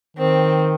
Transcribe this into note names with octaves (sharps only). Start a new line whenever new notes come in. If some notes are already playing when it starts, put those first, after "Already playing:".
D#3 C4